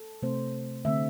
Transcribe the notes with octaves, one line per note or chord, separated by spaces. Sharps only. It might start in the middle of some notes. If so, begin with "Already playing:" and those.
Already playing: A4
C3 A3 C4 C5
D3 A3 C4 E5